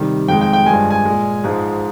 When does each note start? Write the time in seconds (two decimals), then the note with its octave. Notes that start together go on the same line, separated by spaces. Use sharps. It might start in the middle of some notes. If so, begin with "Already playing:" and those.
Already playing: C3 D#3 G3
0.28 F2 D#3 G#3 G5
0.41 G5
0.53 G5
0.66 G2 F3 G#3 G#5
0.90 G#5
1.05 A#2 G#3
1.44 G#2 F3 G#3